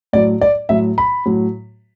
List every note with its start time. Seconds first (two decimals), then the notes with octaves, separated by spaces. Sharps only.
0.13 A2 F#3 D5
0.41 D5
0.69 A2 F#3 E5
0.98 B5
1.26 A2 F#3